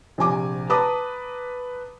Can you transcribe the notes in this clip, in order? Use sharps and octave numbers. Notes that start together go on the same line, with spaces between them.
A#1 C3 G#5 D6
B4 A5 A#5 D6 D#6